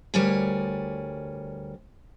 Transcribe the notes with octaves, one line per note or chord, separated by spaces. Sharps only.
D2 G3 A#4 C#5 D5 G#5